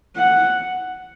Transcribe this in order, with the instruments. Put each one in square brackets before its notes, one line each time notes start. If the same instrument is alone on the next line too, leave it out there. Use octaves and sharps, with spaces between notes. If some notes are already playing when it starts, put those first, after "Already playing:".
[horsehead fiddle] F#5